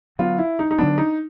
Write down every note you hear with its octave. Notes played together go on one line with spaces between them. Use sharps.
D3 F#3 B3 F4
E4
D#4
D#4
D3 F#3 B3 D4
D#4